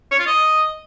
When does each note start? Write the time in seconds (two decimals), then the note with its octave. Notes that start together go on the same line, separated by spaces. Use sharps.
0.11 C#5
0.19 F4
0.27 D#5